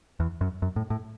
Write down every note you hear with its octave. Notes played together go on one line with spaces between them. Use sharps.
E2
F#2
F#2
A2
A2